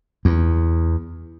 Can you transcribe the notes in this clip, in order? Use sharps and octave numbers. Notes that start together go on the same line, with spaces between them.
E2